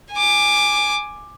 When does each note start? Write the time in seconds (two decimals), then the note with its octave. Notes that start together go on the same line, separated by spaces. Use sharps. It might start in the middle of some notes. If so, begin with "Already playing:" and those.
0.13 G#5 D6